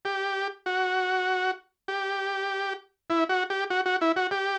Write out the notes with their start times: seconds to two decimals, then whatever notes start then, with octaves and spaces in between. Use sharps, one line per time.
0.05 G4
0.66 F#4
1.88 G4
3.10 E4
3.29 F#4
3.50 G4
3.70 F#4
3.86 F#4
4.01 E4
4.16 F#4
4.31 G4